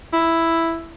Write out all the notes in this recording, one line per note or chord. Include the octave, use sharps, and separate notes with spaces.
E4